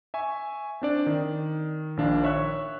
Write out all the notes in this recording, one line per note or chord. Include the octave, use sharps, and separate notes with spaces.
E5 G#5 C#6
C4 D4 D5
D#3
A#1 D#3 D4 F5
C#5 E5 C#6 F#6